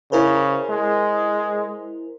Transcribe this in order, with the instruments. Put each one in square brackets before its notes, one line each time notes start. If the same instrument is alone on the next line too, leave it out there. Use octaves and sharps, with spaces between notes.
[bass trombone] C#3 [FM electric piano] E4 A#4 C5
[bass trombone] G#3